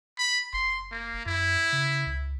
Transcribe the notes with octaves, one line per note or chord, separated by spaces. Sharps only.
B5
F#1 C6
A#3
F#2 E4
C#3
C#2